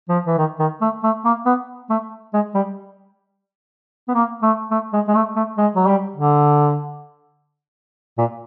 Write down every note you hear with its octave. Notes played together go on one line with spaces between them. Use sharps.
F3
E3
D#3
D#3
A3
A3
A#3
B3
A3
G#3
G3
B3
A#3
A3
A3
G#3
G#3
A3
A3
G#3
F#3
G3
D3
A#2